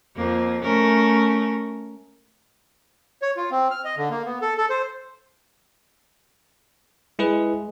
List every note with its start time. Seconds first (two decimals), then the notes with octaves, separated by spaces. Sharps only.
0.16 F2 A#3
0.63 A3 C#4 A#4
3.22 C#5
3.37 F4
3.51 C4
3.71 F6
3.85 D#5
3.97 D3
4.10 A#3
4.25 B3
4.41 A4
4.57 A4
4.70 C5
7.19 G#3 E4 G#4 B4